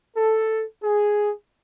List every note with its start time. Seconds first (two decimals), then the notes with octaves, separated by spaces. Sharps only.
0.15 A4
0.83 G#4